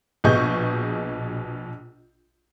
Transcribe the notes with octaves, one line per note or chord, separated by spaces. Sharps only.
A#1 B2 G#4 D#5 C#6 G6